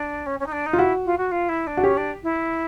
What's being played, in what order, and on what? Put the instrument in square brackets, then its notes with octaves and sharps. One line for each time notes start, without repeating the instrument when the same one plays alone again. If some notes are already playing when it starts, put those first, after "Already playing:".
Already playing: [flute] D4
C#4
C#4
D#4
D4
D#4
[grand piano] F4
[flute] E4 [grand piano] F#4
[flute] F4
F#4
F4
E4
D4
[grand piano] F#4
[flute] C#4 [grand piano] G4
[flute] D4
E4